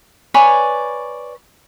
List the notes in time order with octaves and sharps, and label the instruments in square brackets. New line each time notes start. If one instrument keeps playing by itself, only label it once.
[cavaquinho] B4 C#5 D5 G#5